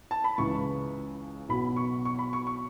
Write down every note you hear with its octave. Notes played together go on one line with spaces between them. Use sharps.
A5
B5
C#2 C#3 E3 C#6
B1 B2 B5
C#6
C#6
B5
C#6
C#6